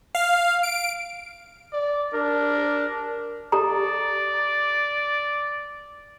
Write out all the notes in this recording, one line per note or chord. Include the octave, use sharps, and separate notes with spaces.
F5
D7
D5
D4 A#4
G4 A4 D5 A#5